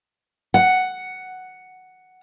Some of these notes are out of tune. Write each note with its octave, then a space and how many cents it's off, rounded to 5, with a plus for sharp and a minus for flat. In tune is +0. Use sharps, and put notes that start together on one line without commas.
F#5 +5